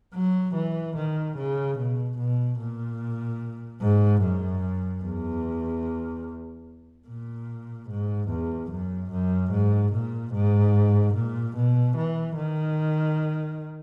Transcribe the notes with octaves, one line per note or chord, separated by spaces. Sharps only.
F#3
E3
D#3
C#3
B2
B2
A#2
G#2
F#2
E2
A#2
G#2
E2
F#2
F#2
G#2
A#2
G#2
A#2
B2
E3
D#3